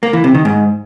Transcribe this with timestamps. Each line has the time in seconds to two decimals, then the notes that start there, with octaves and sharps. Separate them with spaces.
0.03 A#3
0.13 E3
0.24 C3
0.34 D#3
0.45 G#2